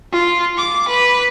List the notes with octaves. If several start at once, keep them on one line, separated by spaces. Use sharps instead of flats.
F4
D6
B4